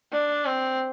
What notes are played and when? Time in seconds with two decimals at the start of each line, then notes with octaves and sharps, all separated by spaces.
0.13 D4
0.46 C4